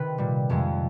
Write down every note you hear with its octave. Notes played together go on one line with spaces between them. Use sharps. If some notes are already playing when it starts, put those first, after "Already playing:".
Already playing: C3 D#3 B4
A#2 G3
F2 C3 F3 G#3